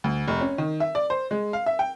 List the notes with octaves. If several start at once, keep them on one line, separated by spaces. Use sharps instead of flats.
D2
F1
C#4
D#3
E5
D5
C5
G#3
F5
E5
G5